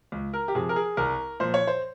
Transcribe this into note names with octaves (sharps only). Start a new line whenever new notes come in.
C#2
A#4
G4
C3 F3 G#4
A#4
G#4
C2 A#4
A#2 F3 C5
C#5
C5